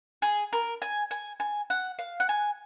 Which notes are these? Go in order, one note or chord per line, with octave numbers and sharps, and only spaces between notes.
G#4
A#4
G#5
G#5
G#5
F#5
F5
F#5
G#5